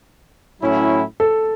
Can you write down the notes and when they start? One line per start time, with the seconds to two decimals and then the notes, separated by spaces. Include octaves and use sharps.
0.61 A2 F#3 C#4 E4
1.20 A4